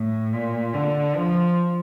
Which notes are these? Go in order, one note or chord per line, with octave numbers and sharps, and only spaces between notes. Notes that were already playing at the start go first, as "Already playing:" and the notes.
Already playing: A2
A#2
D3
F3